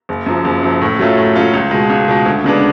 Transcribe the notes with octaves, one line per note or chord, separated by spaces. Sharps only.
F#1
F#2 F3
F#1
F#2 F3
A2
F#3 A3 C#4 F4
A2
F#3 A3 C#4 F4
C#2
B2 G#3
C#2
B2 G#3
D2
C#3 G#3 B3 D4